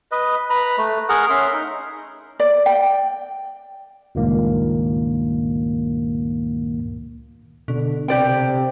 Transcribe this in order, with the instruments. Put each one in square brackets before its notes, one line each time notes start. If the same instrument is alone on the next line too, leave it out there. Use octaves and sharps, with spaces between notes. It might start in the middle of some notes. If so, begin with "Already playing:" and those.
[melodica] B4 D#5
B4 A#5 B5
A3
G#4 A#4 F#5 A#5
C#4 E5 C6
D#4
[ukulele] D5
G5
[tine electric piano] C#2 G2 A#2 D#3 A#3
[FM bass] B2 [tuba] D3
[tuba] C3 [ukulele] G4 D5 G5